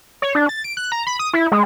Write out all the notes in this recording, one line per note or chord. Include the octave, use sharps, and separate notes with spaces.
C#5
D4
A6
D7
F#6
A#5
B5
D#6
E4
G#3